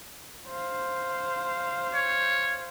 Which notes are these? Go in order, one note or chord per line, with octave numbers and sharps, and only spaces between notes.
C5 F5
C#5